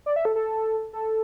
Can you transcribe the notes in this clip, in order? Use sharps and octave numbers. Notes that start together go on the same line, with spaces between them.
D5
E5
A4
A4
A4